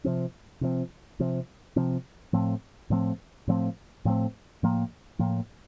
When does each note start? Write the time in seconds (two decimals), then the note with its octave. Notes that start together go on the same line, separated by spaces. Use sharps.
0.04 C3 F3 C4
0.61 C3 F3 C4
1.20 C3 F3 C4
1.76 C3 F3 C4
2.33 A2 F3 A3 C4
2.90 A2 F3 A3 C4
3.48 A2 F3 A3 C4
4.05 A2 F3 A3 C4
4.63 A2 F3 A#3
5.19 A2 F3 A#3